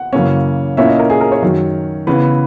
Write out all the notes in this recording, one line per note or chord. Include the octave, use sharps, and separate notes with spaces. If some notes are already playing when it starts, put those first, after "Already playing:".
Already playing: F#5
F#2 C#3 E3 A#3 C#4
A#2 A#3 C#4 E4 E5
D#5
A#4
G#4
A#4
C#5
F#2 D#3 F#3
C#3 E3 B3 B4